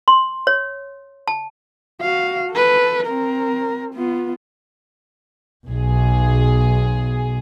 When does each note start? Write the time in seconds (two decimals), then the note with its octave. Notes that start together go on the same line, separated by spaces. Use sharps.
0.08 C6
0.47 C#5
1.28 A5
2.01 F#4 F5
2.52 A4 B4
3.06 C4 A#4
3.94 B3 F4
5.68 B1 G#4